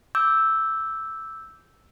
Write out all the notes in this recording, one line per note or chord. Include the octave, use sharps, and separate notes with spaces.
D6 E6 G6